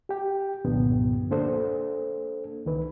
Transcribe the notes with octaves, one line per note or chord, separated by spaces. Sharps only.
G4 G5
C2 G2 A#2 D3 F3 B3
A#3 D4 A4 C5
C2 D#3 B4